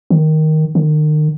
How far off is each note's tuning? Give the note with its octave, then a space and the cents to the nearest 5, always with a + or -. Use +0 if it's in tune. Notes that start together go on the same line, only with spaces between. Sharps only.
D#3 +5
D#3 -35